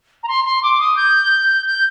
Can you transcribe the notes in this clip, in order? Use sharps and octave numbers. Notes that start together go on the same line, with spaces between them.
A#5
C6
C6
D6
D#6
G6
G6